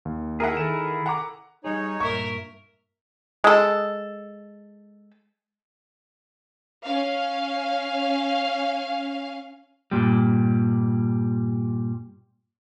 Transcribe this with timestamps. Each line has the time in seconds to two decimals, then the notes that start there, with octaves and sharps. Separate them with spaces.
0.05 D#2
0.40 E4 G#4 A#4 E5 F#5
0.57 D#3 A4 E7
1.06 F#5 A#5 D6
1.64 G3 D#4 G#4 C#5
2.00 G2 A#2 A#4 E5 C#6
3.44 G#3 A4
6.85 C#4 F5
9.91 G2 A#2 G3